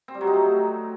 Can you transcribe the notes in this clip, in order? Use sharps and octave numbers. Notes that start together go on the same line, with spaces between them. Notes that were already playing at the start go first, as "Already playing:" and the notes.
C4
G3
F#3
D#4
A3